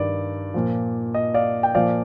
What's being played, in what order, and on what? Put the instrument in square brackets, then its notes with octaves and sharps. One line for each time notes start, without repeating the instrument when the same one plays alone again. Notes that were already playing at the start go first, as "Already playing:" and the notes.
Already playing: [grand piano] G2 D#3 D5
A#2 F3
D#5
D5 F5
G5
A#2 F3 D5 F5